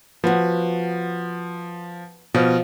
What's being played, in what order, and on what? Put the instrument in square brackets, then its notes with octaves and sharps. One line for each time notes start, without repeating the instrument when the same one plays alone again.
[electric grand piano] F3 [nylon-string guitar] B3 F#4
[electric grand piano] B2 [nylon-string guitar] F3